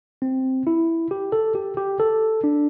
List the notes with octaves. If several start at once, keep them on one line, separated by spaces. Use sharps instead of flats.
C4
E4
G4
A4
G4
G4
A4
D4